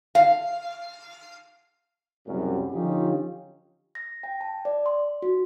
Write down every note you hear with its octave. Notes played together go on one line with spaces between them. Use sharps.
F5
F#1 C2 F#2 G3
D3 F3 C#4 D#4 F4 G4
A#6
G5
A5
D5
C6
F#4